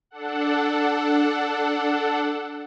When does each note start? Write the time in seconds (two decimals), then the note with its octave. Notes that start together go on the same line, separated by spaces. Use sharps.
0.11 D4 A4 F#5